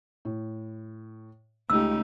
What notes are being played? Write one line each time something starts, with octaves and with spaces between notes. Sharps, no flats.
A2
C#2 C#3 A3 D#4 G4 E6